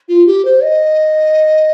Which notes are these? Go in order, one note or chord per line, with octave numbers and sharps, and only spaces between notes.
F4
G4
C5
D#5